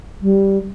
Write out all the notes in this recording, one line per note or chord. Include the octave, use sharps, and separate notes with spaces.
G3